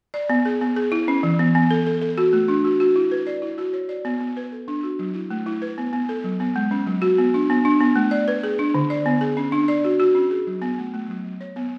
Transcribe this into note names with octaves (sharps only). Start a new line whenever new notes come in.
D5
B3
G#4
B3
G#4
E4
C#4
E3
B3
B3
A4
A4
A4
F#4
A3
D4
F#4
F#4
E4
B4
D5
E4
F#4
C#5
D5
B3
B3
B4
A4
D4
F#4
F#3
E4
A3
E4
B4
B3
B3
A4
F#3
B3
G#3
C#4
F#3
F#4
B3
D4
B3
D4
B3
A3
D5
B4
G#4
D4
D3
D5
B3
G#4
C#4
D4
D5
F#4
F#4
C#4
G#4
F#3
B3
A3
A3
F#3
F#3
C#5
B3